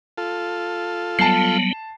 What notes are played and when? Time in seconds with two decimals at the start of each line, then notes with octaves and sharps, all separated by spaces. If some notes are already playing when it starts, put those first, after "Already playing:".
0.18 F4 A4
1.19 F#3 G3 B3 A5 C7